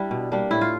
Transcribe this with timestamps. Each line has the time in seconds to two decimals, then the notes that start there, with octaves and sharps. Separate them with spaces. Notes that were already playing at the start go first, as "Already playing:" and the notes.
Already playing: G3 D4 E4
0.11 B2
0.32 G3 A#3 D4
0.51 A2 E4
0.61 F4